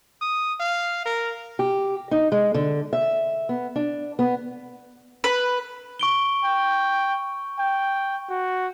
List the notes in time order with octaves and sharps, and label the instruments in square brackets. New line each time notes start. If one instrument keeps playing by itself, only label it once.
[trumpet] D#6
F5
A#4
[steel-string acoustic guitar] G4
D#4
G#3
D3
E5
B3
D4
B3
[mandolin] B4
[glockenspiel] C#6 D7 G7
[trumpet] G5
G5
F#4